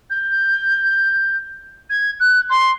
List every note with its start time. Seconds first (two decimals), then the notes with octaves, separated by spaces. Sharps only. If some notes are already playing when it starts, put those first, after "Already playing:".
0.10 G6
1.89 G#6
2.20 F#6
2.49 C6